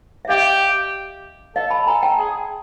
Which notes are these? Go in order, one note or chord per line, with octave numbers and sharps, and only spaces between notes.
E5
G4 D#5 F5
A4 D#5 F5
A5 B5
A4 G#5 A#5
G5 A5
G#4